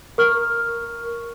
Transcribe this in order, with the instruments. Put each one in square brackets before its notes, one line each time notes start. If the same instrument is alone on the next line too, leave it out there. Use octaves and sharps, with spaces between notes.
[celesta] A#4 C#6 F6